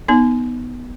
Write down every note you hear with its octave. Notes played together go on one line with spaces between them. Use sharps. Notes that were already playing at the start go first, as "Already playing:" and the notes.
B3 D#4